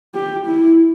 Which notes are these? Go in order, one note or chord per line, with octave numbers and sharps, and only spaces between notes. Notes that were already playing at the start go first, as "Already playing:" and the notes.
G4
E4